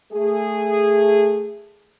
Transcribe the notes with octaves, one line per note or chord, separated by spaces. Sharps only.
A3 G#4